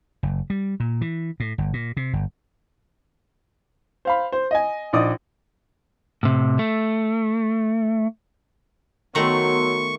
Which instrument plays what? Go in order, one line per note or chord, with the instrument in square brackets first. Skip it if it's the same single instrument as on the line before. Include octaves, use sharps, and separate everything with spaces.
[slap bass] F#1
G3
A#2
E3
A2
G1
A#2
C3
G1
[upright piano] C5 F5 B5
C5
D#5 G#5
A#1 D#4 D5 D6 D#6
[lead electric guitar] A2 C3
A3
[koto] D#3 A3 [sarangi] F#3 [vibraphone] B3 C6 E6 [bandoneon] C#6